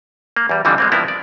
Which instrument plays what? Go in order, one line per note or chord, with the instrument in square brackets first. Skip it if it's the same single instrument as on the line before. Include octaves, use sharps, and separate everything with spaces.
[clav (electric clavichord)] A#3
E2 G3
F2 D3 E3 F3 G3 C4
G#3 A#3 C4
G2 F3 B3 C4 E4 A#4
D5